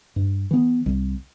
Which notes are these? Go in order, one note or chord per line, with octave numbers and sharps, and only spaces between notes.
G2
E3 B3
C2